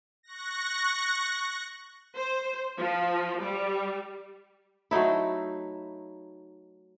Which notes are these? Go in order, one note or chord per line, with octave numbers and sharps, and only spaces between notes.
C#6 F#6 A#6
C5
F3
G3
F#3 A3 D#4 E4